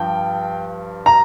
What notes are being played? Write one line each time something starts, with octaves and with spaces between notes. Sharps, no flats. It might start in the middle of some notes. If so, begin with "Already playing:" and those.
Already playing: G2 F3 G5
A#5